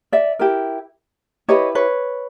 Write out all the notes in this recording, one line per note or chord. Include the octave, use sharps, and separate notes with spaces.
D5 E5
E4 G4 A#4
E4 G4 B4 C#5 D#5
B4 C#5